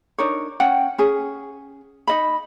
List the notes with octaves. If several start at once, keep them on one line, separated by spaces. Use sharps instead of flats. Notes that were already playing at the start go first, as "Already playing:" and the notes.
D4 D#4 A#4 C#5
C#4 C#5 F#5 G5
C#4 G#4
D#4 D#5 B5